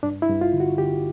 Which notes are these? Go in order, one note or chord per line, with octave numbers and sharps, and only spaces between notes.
G2 D4
E4
G2
F4
D3
F#4
D3 G4